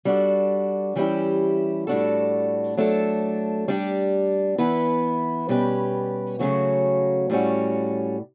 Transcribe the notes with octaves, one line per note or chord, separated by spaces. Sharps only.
G3 D4 F#4 A4
E3 G3 C#4 E4 G4
A2 G3 D4 F#4 A4
F#3 A3 D4 A4
G3 D4 G4
E3 B3 E4 B4
B2 G3 C#4 G4 B4
C#3 F#3 A3 C#4 F#4
A2 G3 C#4 F#4